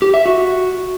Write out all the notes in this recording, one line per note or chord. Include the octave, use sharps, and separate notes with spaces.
G4
E5
F#4